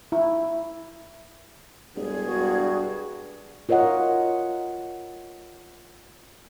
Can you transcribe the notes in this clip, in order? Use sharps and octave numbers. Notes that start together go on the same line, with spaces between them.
E4
E1 G2 G#4
G2 F#4
F4 A#4 C#5 D#5 F#5